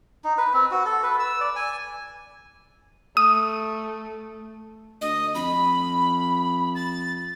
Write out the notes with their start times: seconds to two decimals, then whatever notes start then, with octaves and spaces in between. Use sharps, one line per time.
0.24 D#4
0.38 B4
0.54 C4
0.71 F#4
0.85 A4
1.03 B4
1.20 E6
1.41 D5
1.56 G#5
3.17 A3 D#6
5.01 D2 D#5
5.35 F2 B5
6.75 A6